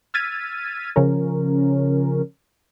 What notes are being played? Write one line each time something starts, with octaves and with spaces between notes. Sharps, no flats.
E6 F6 G#6 A6 B6 D#7
C#3 F3 C#4 A#4